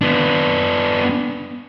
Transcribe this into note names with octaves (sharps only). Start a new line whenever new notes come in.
B3 D4